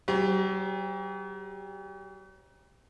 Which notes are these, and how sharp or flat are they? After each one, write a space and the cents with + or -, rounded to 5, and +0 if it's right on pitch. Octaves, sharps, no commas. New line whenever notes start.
F#3 +45 G4 +30 C5 +0